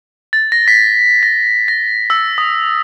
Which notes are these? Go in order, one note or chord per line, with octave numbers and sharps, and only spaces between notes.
A6
A#6
B6
A#6
A#6
E6
D#6